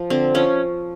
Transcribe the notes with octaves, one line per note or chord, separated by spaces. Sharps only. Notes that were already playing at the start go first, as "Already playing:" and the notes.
Already playing: F3
D3 C4
F3 C#4